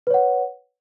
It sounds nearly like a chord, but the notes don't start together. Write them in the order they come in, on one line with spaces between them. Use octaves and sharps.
B4 C#5 F#5